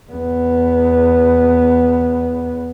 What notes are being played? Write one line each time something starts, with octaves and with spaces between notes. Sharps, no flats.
E2 B3